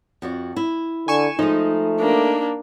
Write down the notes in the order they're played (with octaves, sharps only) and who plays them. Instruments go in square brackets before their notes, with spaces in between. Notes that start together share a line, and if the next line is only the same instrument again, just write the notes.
[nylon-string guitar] F2 F#4 D5
E4
[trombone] D3 [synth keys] G#5 C#6 E7
[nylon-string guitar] F3 G#3 [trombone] A3 [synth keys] D#4
[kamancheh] A#3 D4